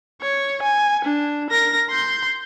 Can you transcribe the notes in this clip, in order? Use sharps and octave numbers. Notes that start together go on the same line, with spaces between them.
C#5
G#5
D4
A#4 A#6
C6 G6